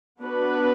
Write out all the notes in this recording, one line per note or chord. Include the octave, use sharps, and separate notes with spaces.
B3 D4 F#4 B4